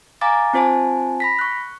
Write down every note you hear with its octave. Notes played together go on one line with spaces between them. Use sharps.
F5 G#5 A#5 D6 A6
C4 F4 C5 G#5 A5
B5 A#6 B6
C#6 F#6